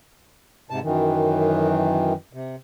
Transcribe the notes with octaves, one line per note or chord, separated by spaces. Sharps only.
G#2 C3 A5
F#2 D#3 E3
C3